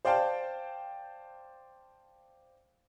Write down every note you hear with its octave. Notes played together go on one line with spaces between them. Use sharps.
C5 D5 F5 G5 A5